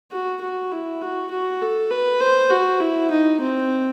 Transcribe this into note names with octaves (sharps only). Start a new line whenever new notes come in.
F#4
F#4
E4
F#4
F#4
A4
B4
C5
F#4
E4
D#4
C4